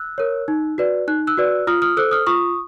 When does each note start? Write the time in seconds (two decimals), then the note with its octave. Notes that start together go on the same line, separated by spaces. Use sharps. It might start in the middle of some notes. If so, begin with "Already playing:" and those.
Already playing: E6 F#6
0.18 A#4 C#5
0.48 D#4
0.78 F#4 B4 D5
1.07 D#4 F#6
1.27 E6 F#6
1.37 F#4 B4 D5
1.67 F4 D#6 F6
1.82 D#6 F6
1.97 A4 C5 E6 F#6
2.11 D#6 F6
2.27 F4 C#6 D#6